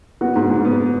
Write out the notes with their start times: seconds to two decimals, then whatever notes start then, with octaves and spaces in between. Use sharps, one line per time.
0.21 B3 F#4
0.36 G#2
0.50 G#2
0.65 B3